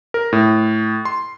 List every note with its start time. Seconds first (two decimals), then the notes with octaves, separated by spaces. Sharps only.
0.14 A#4
0.33 A2
1.05 C6